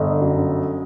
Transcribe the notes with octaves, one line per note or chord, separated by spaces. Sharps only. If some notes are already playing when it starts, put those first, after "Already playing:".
Already playing: G1 D#5
F#2